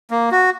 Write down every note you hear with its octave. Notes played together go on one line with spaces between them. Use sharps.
A#3
F#4